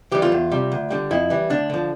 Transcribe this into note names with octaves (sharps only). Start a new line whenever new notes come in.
E3 G3 G4
F4
E2
C3 G3
D2
D3 G3
F2 E4
E3 G3
D2 D4
D3 F3